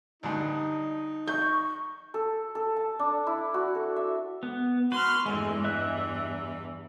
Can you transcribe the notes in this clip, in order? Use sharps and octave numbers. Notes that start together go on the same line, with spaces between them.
D2 G2 D#4
C#6 G6
A4
A4
A5
D4
E4
F#4
A4
E5
B3
F#4 B4 C6 F6
E2 G2 E3 G#3 A3
D#5 E5 F#6